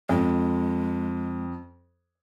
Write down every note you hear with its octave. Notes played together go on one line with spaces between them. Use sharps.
F2 G#3